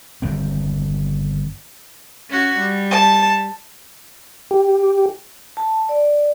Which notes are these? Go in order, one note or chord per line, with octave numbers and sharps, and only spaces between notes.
G1 C3 D#3 C4
C#4 F#4
G3
A5
G4
A5
D5